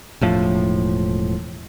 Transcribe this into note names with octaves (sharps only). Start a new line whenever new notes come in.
E1 A2 F3